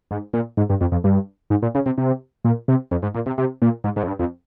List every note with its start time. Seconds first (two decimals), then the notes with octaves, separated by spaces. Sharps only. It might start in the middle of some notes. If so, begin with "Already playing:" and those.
0.11 G#2
0.33 A#2
0.57 G#2
0.70 G2
0.81 F2
0.92 F2
1.04 G2
1.50 G#2
1.62 A#2
1.75 C#3
1.86 C3
1.98 C3
2.45 A#2
2.68 C3
2.91 F2
3.03 G#2
3.15 A#2
3.26 C3
3.38 C3
3.62 A#2
3.84 G#2
3.96 G#2
4.03 F2
4.08 G2
4.19 F2